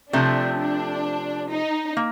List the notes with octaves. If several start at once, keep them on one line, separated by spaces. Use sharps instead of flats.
C3 F3 A3 D4
D4
D#4
A#3